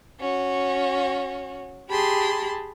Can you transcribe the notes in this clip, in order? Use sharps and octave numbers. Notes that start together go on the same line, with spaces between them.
C#4 F#4
G4 G#4 A5 B5 C6